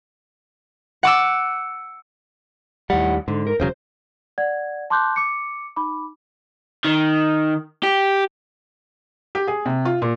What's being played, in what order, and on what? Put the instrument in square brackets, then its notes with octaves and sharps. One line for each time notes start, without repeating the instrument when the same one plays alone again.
[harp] F#5 D6 E6
[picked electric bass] D#2 G3 [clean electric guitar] A2 F#5
[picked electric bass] G#2 [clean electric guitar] D3
[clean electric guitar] A#4
[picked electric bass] E1 C#3 F#3 [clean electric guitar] C5
[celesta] D5 F#5 G#6
A5 C6 D6 F#6 G6
D6 C#7
D#4 B5 D6
[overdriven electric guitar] D#3
G4
[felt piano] G4
G#4
C3
F4
A#2